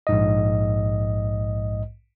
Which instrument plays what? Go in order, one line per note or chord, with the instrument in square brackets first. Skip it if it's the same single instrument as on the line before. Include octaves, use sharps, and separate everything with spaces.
[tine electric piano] A#1 G#2 D#5